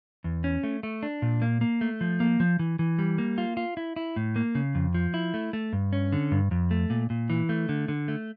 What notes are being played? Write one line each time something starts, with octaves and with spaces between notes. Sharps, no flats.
E2
C#4
A3
A3
D4
A#2
A#3
A#3
A3
F3
A#3
F3
E3
E3
G3
A#3
F4
F4
E4
E4
A2
A#3
C#3
F2
F3
E4
A3
A3
G2
C#4
D3
G2
F2
A3
A#2
A#2
E3
A3
D3
D3
A3